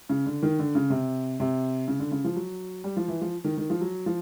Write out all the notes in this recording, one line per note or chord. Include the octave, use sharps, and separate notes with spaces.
C#3
D3
D#3
D3
C#3
C3
C3
C#3
D3
C#3
F3
F#3
G3
F3
E3
F3
D#3
D#3
F3
F#3
F3